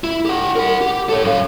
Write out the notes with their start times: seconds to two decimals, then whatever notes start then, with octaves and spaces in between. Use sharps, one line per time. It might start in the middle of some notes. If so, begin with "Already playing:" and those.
0.04 E4
0.25 G4 F#5
0.56 A#4 F#5
0.81 G4
1.09 A4 C#5
1.24 F#2 F5